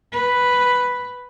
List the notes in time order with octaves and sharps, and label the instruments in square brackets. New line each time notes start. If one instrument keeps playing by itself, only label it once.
[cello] B4